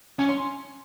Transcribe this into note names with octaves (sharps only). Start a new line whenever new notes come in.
C#4 G#5
C6